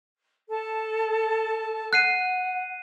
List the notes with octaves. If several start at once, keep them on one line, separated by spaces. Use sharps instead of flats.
A4 A5
F#5 F#6 C7 D#7